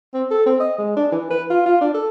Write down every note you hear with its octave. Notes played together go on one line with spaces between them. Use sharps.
C4
A4
C4
D#5
G#3
D4
E3
B4
F4
F4
D4
A4